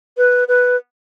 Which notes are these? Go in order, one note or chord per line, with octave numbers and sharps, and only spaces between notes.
B4
B4